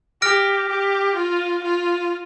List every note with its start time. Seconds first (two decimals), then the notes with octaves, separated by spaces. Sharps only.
0.22 G4 F6 A#6 D7
0.69 G4
1.16 F4
1.64 F4